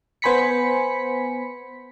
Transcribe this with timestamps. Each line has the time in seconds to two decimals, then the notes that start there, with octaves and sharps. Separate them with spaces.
0.22 B3 C5 G#5 B5 B6 C#7